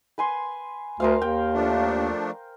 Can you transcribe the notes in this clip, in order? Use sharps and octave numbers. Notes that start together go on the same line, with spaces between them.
B4 G#5 C6
D2 A#4 C5 F5
D#2 G5
F3 A3 D4